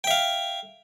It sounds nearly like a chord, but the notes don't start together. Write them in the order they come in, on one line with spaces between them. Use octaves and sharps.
G5 E5 F5